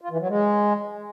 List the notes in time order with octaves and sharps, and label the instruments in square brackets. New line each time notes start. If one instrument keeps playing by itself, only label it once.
[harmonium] F4
E3
F#3
G#3